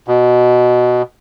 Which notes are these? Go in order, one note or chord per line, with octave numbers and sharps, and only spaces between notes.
B2